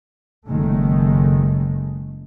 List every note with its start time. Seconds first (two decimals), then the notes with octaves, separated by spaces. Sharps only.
0.49 F#1 D#3 G#3 A3